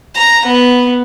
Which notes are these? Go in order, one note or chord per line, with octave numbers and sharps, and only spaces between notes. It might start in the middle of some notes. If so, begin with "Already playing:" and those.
A#5
B3